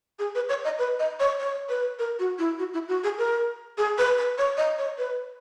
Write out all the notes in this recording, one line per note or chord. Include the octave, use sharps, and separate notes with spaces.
G#4
B4
C#5
D#5
B4
D#5
C#5
C#5
B4
A#4
F#4
E4
F#4
E4
F#4
G#4
A#4
G#4
B4
B4
C#5
D#5
C#5
B4